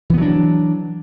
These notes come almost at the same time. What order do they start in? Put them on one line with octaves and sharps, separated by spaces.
E3 B3 F#3 D4